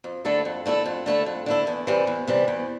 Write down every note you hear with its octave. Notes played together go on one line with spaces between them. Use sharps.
F2
D3 A3 E4 A4
F2
D3 A3 E4 A4
F2
D3 A3 E4 A4
F2
D3 A3 E4 A4
E2
C3 E3 G3
E2
C3 E3 G3
E2